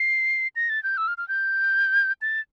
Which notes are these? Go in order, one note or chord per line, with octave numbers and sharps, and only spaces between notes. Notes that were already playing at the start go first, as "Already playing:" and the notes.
Already playing: C7
A#6
A6
G6
E6
F6
F6
G6
A6